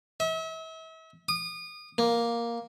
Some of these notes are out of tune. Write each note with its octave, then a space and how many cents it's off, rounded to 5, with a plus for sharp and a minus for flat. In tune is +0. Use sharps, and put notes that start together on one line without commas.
E5 -40
D#6 -30
A#3 +5